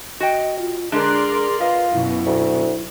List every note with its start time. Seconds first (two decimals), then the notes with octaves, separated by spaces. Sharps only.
0.20 F#4 D#5 G5
0.59 F4
0.92 D3 G#3 D4 G#4 A#4 D5 C6
1.60 F4 B4 D#5
1.92 F#2 B2 E4
2.26 D2